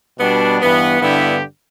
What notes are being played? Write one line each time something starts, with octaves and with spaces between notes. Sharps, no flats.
B2 G3 B3 D4
G2 E3 B3
G2 D3 B3 E4 G4